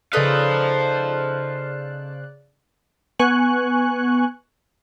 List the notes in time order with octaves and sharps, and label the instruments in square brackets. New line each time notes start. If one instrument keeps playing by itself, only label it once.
[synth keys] C#3 D5 F#6 [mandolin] D#4 A4 B4 [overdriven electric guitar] C5 F5
[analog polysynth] B3 G#5 C#6 F#6